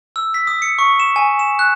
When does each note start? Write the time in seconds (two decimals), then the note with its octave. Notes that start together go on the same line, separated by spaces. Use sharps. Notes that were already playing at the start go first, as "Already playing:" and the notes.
0.16 E6
0.34 B6
0.47 D#6
0.62 C#7
0.79 C#6
1.00 E7
1.16 G#5
1.39 E7
1.59 F#6